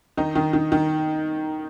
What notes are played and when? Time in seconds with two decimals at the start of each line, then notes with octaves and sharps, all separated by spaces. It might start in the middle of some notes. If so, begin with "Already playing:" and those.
0.17 D#3 D#4
0.35 D#3
0.53 D#3
0.72 D#3